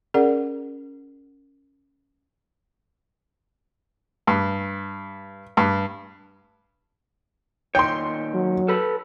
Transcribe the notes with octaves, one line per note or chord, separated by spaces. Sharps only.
C#4 G#4 A#4 D5 F#5
G2
G2
A#2 D#3 C#5 G5 C6
F#3
A4 B4 B5